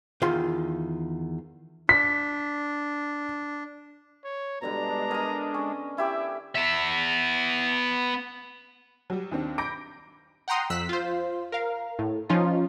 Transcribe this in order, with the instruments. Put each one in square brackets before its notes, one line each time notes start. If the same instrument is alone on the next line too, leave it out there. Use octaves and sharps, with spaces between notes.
[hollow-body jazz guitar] E2 D#3 F4 G5 C6
[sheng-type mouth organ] D4 [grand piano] B6
[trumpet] C#5
[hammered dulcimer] B2 D3 G3 [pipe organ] G#3 D4 [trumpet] A#5
[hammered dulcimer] A#4 G#5 B5 [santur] D#5 D#6
[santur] C#4
[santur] E4 G4 D5 [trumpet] E5
[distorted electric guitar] B3 E5
[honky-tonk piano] F#3 G3
D#2 D#3 C4 D4
B5 D6 G6 A#6 D7
[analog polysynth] F#5 G5 A#5 C6 D#6
F2 E6 F#6 B6
F4 C5
A#4 F5
A2
F3 C#4 D#4 F4